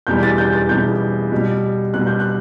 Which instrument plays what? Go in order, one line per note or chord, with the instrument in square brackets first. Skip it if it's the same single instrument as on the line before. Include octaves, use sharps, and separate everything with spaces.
[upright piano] E2 B2 G3 G6
A6
G6
A6
E2 B2 G3 G6
B2 G3
B2 G3 F#6
G6
F#6